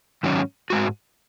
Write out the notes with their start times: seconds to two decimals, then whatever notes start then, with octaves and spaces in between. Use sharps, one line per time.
0.23 G#2 D#3 F#3 C#4
0.70 G#2 G#3 F#4